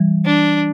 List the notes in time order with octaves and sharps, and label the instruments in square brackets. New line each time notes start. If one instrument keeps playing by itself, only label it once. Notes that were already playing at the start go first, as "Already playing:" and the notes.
Already playing: [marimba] E3 G3
[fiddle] D4